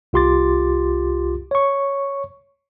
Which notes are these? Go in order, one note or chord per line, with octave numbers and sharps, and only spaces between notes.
C2 F4 G4 C6 D6 A6
C#5 C#6